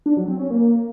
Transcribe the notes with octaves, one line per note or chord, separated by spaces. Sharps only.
D4
F#3
C4
C#4
A#3